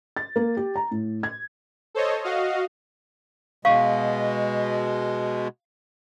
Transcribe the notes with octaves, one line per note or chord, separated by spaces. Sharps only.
A6
A#3
G4
A#5
A2
G#6
A4 C5 C#5 D#5
F#4 D#5 F5
B2 G#3 F5 C#6